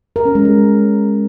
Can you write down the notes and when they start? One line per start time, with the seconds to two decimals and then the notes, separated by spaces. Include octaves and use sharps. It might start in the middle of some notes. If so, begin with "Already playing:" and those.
0.16 A#4
0.25 C#4
0.35 G#3
0.45 G#4